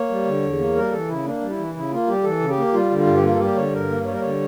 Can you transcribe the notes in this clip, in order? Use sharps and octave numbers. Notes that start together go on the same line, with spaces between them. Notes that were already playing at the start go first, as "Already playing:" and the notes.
Already playing: A#3 C#5
G3
D3
E2
A#3
G3 A#4
E3 A4
C#3 E4
A#3 D4
G3
E4
E3
C#3 E4
A#3 F4
G3 G4
E3 A4
C#3
G4
A#3
G3 F4
D3
F4
G2
G4
A#3 F4
A4
G3 G4
D3 C#5
G2 A#4
A#3
G3 C#5
A#4
D3 C#5